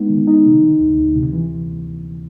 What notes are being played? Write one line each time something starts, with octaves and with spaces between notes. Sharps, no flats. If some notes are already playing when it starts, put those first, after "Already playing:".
Already playing: G#3 B3 D#4
D#3
D#4
C3
D#3
D2
D2
C3
E3